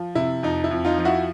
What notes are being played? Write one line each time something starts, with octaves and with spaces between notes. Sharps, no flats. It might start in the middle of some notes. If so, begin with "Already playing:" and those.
Already playing: F3
C3 E4
F2 D#4
E4
F2
D#4 F4
F3
E4 F#4